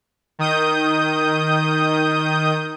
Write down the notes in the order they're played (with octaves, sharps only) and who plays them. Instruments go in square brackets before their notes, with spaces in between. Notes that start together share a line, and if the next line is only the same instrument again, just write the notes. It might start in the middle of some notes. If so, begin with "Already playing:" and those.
[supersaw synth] D#3 D#6 G6